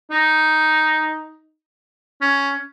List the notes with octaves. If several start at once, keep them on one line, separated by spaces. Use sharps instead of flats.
D#4
C#4